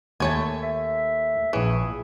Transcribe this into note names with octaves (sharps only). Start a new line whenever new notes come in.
D#2 A3 C#5 G#5
E5
A#1 E3 G#4 C#5